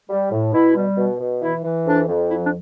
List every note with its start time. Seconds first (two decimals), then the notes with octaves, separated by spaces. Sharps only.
0.10 G3
0.32 A2
0.53 B2 E4
0.76 G3
0.97 B2
1.20 B2
1.42 E3 E4
1.64 E3
1.87 F2 D4
2.08 F2
2.30 F3 E4
2.46 D4